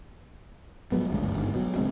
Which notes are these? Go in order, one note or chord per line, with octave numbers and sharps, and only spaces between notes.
F3 F#3 G#3 B3
G#1 D2 G2 C#3
G1 G#2
B2 F#3
D#1 D3 G#3 C4